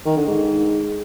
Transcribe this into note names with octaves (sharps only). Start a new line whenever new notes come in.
D#3
D3
G#2